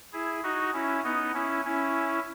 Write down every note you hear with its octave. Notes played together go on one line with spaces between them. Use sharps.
E4 G#4
D#4 F#4
C#4 E4
B3 D#4
C#4 E4
C#4 E4